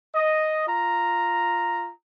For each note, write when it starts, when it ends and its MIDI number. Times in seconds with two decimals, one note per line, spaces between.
0.15 0.66 75
0.68 1.92 65
0.68 1.92 82